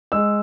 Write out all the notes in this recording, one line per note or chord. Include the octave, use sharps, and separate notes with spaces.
G#3 E6